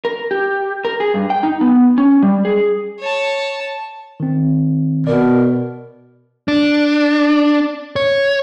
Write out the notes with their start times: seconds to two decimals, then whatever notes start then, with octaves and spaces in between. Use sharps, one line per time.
0.05 A#4
0.31 G4
0.85 A#4
1.00 G#4
1.14 G2
1.30 G5
1.43 D#4
1.61 B3
1.98 C#4
2.22 G3
2.45 G#4
2.99 C#5 A5
4.20 D#3 C4
5.07 B2 A#4 D5
6.48 D4
7.96 C#5